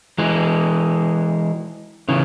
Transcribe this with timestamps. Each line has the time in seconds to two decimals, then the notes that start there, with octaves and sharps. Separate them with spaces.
0.18 E3 G#3
2.09 C#3 E3